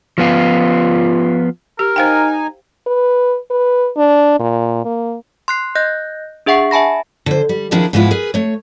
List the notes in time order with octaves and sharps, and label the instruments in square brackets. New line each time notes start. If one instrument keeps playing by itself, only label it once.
[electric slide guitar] F3 B3 F4
[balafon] G4 [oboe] A#4
[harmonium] D#4 G#5 [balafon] C5 F5 G5
[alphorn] B4
B4
D4
A#2
A#3
[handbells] C6 F#6 C7
D#5 F#6 G6 A#6
D4 G#4 E5 F#5 C#6 C7
E5 G#5 A5 B5 A#6
[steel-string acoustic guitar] D3 C5
G3
D#3 F3 D4 E4 G#4 A#4
G#2 F3 G#3 B3 E4 F4
G#4 A#4 B4
A3 C#5